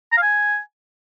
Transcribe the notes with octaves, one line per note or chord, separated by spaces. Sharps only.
A#5
F5
G#5